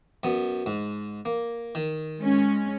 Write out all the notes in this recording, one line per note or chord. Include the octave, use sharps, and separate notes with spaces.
F#2 B3
G#2
A#3
D#3
G#3 C#4